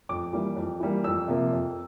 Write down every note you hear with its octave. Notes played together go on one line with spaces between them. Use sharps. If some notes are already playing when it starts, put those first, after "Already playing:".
F2 D6
E3 G3 A#3
F2
E3 G3 A#3
F2 E6
C3 F3 A#3
F2